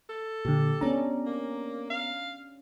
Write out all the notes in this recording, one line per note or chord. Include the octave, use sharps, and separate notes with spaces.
A4
A#2 D3 G4
B3 C#4 D4 A#5
A#3
F5